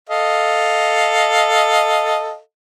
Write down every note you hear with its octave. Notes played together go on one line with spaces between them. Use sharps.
A4 D#5 F5